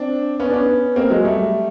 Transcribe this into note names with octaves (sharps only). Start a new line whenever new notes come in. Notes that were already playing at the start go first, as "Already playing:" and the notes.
Already playing: C4 D4
B3 C#4
D4
B3 C#4
A#3 C4
F#3 G#3
G3 A3